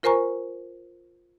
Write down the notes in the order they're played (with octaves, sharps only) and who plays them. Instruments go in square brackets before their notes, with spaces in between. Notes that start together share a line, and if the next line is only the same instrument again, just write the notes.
[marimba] F4 A#4 C5 G#5 A#5 C#6